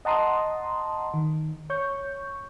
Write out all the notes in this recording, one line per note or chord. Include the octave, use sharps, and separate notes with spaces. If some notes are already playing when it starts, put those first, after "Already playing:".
D#5 F#5 A5 A#5 C6 D#6
D#3
C#5 C#6 G6